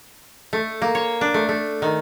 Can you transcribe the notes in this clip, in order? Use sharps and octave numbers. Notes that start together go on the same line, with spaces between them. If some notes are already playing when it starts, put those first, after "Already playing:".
A3
A#3
C#5
D4
A3
A3
D#3